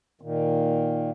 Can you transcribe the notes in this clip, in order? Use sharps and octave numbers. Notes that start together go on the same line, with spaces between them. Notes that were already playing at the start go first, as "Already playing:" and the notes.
A#2 D#3